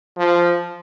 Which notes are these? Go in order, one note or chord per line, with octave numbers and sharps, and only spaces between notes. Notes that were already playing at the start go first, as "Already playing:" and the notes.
F3